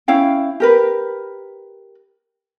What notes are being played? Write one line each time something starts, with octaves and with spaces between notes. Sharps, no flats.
C#4 E4 F5 G5
G4 A#4 B4